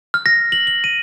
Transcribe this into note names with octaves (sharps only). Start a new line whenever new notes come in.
F6
A#6
F#7
F#7
D#7